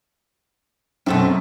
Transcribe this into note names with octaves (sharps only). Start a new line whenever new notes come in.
F#2 B2 A3 C4